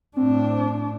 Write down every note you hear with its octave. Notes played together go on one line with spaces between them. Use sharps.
A2 C4 D4